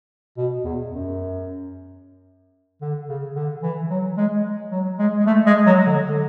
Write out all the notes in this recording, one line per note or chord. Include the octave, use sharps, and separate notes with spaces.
B2
E2
F#2
D3
C#3
D3
E3
F#3
G#3
F#3
G#3
G#3
A3
G#3
F#3
D3
D3